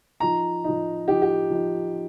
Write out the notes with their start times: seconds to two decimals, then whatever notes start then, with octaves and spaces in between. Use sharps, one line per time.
0.20 F3 D#4 A#5
0.64 F3 D#4
1.07 F3 D#4 G4
1.22 G4
1.51 F3 D#4